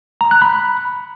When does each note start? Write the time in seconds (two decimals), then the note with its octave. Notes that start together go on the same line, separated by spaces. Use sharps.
0.21 A#5
0.31 F#6
0.42 B5